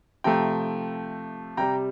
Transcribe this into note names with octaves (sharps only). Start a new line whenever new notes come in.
C3 F3 A3 G5 A#5
C3 G3 G5 A#5